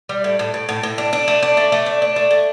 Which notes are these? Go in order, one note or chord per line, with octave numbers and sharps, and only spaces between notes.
G3
A2
A2
A2
A2
A2
D4
D4
A3
D4
A3
A3
D4
D4
A3
A3